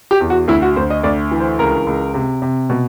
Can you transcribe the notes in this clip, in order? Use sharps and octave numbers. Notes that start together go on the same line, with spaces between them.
G4
E2
F#4
D2 E4
F#4
D2 C5
D#5
D2 D5
E3
C5
C#2 A#4
C#2
C3
C3
B2